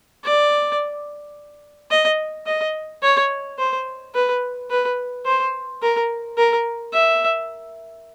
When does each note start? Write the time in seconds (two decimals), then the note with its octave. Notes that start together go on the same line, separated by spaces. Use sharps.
0.24 D5
1.91 D#5
2.47 D#5
3.02 C#5
3.59 C5
4.14 B4
4.70 B4
5.26 C5
5.82 A#4
6.38 A#4
6.93 E5